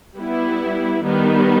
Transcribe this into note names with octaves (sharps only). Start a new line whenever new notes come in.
G3 B3 E4
D#3 G3 B3